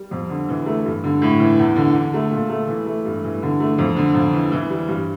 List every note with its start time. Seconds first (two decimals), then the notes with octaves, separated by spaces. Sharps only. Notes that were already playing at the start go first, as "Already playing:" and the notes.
Already playing: G3
0.11 F2
0.30 D3
0.49 E3
0.66 A3
0.85 G2
1.04 D3
1.22 A2
1.40 E3
1.59 E2
1.76 D3
1.94 D3
2.14 A3
2.31 A#2
2.49 A3
2.68 E3
2.86 A3
3.05 G2
3.24 E3
3.42 D3
3.60 A3
3.78 F2
3.97 D3
4.15 F2
4.33 E3
4.52 E3
4.70 G3
4.88 G2